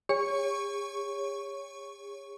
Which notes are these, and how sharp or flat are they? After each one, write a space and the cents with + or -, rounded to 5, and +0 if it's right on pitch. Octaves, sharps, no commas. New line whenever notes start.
G#4 -45 C#5 +0 C#6 +0